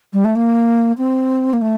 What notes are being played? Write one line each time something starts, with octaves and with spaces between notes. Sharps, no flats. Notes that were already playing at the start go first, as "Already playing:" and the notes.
G3
A3
A#3
C4
A#3
A3